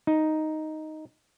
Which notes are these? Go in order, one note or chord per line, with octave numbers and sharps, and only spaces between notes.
D#4